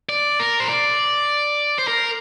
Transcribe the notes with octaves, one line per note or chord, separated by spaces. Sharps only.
D5
A#4
C5
D5
C5
A#4